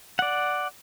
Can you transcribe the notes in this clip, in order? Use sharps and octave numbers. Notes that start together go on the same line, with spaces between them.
D5 F#5